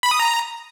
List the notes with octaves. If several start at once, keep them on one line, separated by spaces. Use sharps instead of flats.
B5
D#6
A#5